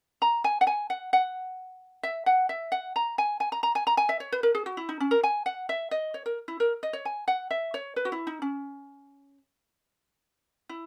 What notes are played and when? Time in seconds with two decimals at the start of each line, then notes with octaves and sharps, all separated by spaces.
0.22 A#5
0.44 G#5
0.61 F#5
0.67 G#5
0.90 F#5
1.13 F#5
2.03 E5
2.26 F#5
2.49 E5
2.72 F#5
2.96 A#5
3.18 G#5
3.40 G#5
3.52 A#5
3.63 A#5
3.75 G#5
3.87 A#5
3.97 G#5
4.09 E5
4.20 C#5
4.32 B4
4.43 A#4
4.55 G#4
4.66 F#4
4.77 E4
4.89 D#4
5.00 C#4
5.11 A#4
5.23 G#5
5.46 F#5
5.69 E5
5.91 D#5
6.14 C#5
6.26 A#4
6.48 E4
6.60 A#4
6.83 D#5
6.93 C#5
7.05 G#5
7.28 F#5
7.51 E5
7.74 C#5
7.96 B4
8.05 F#4
8.12 E4
8.27 D#4
8.42 C#4
10.69 E4